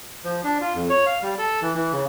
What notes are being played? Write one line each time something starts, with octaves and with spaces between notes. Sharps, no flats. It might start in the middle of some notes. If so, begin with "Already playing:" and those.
F3
D4
F4
F2
C#5
F5
G3
A4
E3
E3
C#3